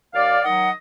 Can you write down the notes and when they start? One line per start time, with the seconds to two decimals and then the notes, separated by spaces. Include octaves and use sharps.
0.14 D#2 D5 F5
0.43 D#3 F#3 D#5 F#5